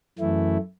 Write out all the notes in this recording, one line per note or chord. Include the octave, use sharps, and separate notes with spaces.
F#2 E3 A3 E4